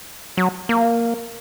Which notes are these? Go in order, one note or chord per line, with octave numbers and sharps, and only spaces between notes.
F#3
A#3